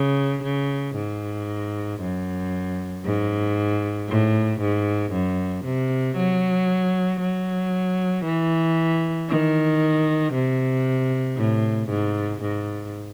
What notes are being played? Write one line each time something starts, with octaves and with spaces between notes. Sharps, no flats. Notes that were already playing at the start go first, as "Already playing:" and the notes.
Already playing: C#3
C#3
G#2
F#2
G#2
A2
G#2
F#2
C3
F#3
F#3
E3
D#3
C3
A2
G#2
G#2